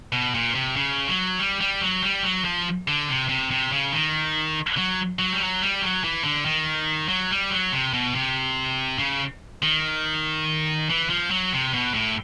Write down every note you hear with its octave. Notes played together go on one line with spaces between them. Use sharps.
B2
A#2
C3
C#3
F#3
G3
G3
F#3
G3
F#3
F3
D3
C3
C3
C3
C#3
D#3
F#3
F#3
G3
F#3
G3
F#3
E3
D3
D#3
F#3
G3
F#3
C3
B2
C3
C#3
D#3
E3
F3
F#3
C3
B2
A2